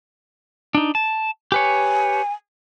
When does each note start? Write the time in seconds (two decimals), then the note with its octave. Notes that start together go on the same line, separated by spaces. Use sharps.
0.75 D4 D#4
0.95 A5
1.52 G4 B4 C#5 G#5